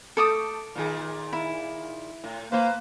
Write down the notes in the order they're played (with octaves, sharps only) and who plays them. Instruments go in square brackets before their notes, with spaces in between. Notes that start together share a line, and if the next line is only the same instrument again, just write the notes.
[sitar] A3 [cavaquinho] A4 D6 D#6
[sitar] A#2 D#3 G#4
[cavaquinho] E4
[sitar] A2
[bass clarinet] A#3 [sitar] B4 C5